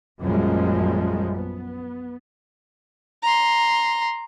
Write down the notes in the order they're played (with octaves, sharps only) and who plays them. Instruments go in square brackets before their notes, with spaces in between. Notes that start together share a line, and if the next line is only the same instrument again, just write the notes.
[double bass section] A#1 F#2 F3 G3 G#3
B3
[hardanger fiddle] A#5 C6